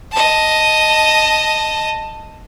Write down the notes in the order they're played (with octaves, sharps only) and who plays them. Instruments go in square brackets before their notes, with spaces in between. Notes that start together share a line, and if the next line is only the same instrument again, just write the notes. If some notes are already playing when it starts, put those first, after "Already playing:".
[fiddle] D#5 A5